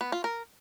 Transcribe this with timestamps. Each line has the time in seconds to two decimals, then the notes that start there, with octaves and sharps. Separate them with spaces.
0.01 B3
0.12 F4
0.24 A#4